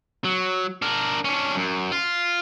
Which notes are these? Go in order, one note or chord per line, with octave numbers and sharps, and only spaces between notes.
F#3
D4 A#4
C#4 D4
F#2
F4